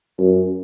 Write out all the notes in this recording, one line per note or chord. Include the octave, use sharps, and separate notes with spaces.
F#2